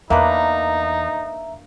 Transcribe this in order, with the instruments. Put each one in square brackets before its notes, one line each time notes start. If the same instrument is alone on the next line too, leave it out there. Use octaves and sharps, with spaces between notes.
[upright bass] E2 [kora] A#3 D4 B4 [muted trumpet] D#4 [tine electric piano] E5 A#5